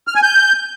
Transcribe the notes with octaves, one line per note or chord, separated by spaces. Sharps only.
F6
G#5
G6